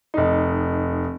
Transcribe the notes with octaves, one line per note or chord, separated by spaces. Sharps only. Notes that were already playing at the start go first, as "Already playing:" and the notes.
F1 D#4